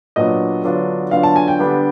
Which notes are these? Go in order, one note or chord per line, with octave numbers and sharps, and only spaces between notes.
A#2 F#3 B3 D4 D#5
D3 F#3 B3 D4 F4
D3 F#3 B3 D4 F4 F5
A5
G#5
G5
D3 G3 B3 D4